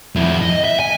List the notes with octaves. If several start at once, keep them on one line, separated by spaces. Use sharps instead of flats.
F2 E4
D#5
E5
G#5